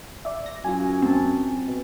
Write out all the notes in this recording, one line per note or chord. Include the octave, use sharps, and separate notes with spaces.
D5 E5
A#6
F#2 F4 G#5
C4 A5
B2